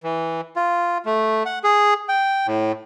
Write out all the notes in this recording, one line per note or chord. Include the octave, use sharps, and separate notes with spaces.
E3
F4
A3
F#5
G#4
G5
A2